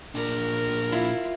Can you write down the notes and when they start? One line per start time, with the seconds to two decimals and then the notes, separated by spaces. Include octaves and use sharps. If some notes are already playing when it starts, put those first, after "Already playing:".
0.15 A#2 D4 A#4
0.92 E4 F4